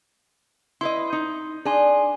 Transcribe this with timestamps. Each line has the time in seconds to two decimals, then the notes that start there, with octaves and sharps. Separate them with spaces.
0.81 E4 B4 D#5 C6
1.13 D#4
1.65 D4 G#4 G#5 C6